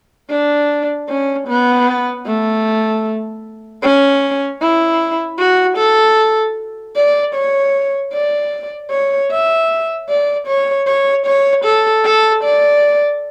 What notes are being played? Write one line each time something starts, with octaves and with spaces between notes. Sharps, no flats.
D4
C#4
B3
A3
C#4
E4
F#4
A4
D5
C#5
D5
C#5
E5
D5
C#5
C#5
C#5
A4
A4
D5